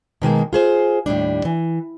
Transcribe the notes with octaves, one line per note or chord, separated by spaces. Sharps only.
B2 D#3 G#3 A#3
F4 G#4 C5
D#2 A2 G3 D4
E3